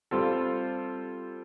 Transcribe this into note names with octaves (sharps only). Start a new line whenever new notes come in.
G3 C4 F4 A4